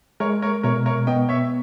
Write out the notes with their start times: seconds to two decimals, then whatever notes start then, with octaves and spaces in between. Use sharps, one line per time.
0.20 G#3 A#4 C#5
0.42 A#4 C#5
0.63 B2 A#4 C#5
0.86 A#4 C#5
1.07 B3 D#5 G5
1.29 C#5 E5